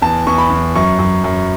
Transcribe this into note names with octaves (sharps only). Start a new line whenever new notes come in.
E2 A5
E2 C#6
B5
E2
F#2 C#6
F#2
F#2